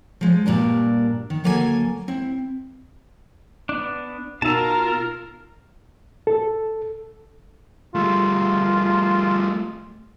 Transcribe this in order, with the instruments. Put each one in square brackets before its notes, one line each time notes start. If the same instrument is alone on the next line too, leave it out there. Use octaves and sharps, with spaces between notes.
[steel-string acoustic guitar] F3 G#3
G2 A#2 G3 D4 A#4
D#3
D2 F#3 A#3 A4 A#4 G#5
C4 E4
[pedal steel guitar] B3 D4
[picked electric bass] B2 [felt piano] D#4 E6 [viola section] F4 A#4 [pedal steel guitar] A5 A#5
[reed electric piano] A4
[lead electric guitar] G3 A3 [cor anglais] F4